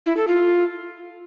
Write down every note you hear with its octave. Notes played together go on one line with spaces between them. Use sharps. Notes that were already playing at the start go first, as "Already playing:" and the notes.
E4
A4
F4